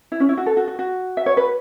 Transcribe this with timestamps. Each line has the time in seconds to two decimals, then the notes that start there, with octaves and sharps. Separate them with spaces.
0.12 E4
0.20 C#4
0.29 E4
0.38 F#4
0.46 A4
0.57 F#4
0.68 F#4
0.79 F#4
1.17 E5
1.26 C#5
1.37 B4